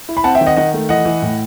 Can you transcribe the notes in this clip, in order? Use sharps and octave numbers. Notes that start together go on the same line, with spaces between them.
E4
B5
C4 F#5 A5
E5 G5
D#3
D#5 F#5
D#3 D#5 F#5
A3
E3 D#5 F#5
E3
A2